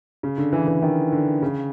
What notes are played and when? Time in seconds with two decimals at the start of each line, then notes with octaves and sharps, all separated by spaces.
0.23 C#3
0.38 D3
0.53 E3
0.68 E3
0.82 D#3
1.12 D3
1.42 C#3